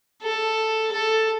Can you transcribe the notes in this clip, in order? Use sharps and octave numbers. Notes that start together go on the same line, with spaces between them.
A4
A4